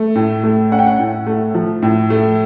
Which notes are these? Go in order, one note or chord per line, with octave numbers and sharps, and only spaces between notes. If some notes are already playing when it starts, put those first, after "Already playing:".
Already playing: A3
A2
A3
C#4 F#5
G5
F#5
A2
A3
F3
A2
A3